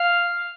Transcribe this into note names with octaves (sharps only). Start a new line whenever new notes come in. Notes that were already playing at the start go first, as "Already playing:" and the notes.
Already playing: F5